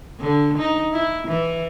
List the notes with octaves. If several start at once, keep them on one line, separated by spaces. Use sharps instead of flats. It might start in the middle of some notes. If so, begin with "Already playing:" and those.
D3
D#4
E4
E3